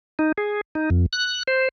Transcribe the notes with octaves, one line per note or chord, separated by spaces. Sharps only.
D#4
G#4
D#4
F2
F#6
C5